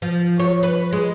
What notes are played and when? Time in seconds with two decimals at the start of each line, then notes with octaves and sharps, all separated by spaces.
0.02 F3
0.39 C#5
0.63 B4
0.93 G#3